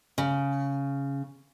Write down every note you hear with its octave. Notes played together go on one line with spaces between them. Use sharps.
C#3